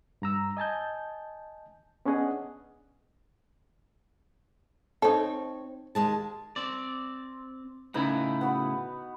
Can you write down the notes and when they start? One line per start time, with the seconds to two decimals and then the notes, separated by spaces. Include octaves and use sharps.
0.22 G2 A#5 E6
0.57 D#5 G#5 A5 G6
2.05 B3 C#4 D4 G#4 D#5 F#5
5.02 C4 D#4 A4 C#5
5.95 D#2 G#3 A5
6.56 C4 D5
7.94 A2 C#3 D#4 E4 B4
8.41 B3 F#4 F#5